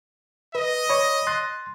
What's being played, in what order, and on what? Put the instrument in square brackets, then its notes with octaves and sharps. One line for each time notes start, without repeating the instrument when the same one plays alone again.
[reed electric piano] B4 [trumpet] D#5
[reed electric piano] C#5 D5 B5
C6 F#6 A6